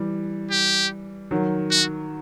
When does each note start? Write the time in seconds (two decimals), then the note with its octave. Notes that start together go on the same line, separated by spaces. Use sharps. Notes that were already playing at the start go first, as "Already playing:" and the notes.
Already playing: E3 G3
0.51 G4
1.31 D#3 F#3
1.71 F#4